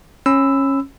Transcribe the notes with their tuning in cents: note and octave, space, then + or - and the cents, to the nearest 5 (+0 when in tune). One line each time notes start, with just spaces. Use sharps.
C#4 -20 B5 +25 E6 +0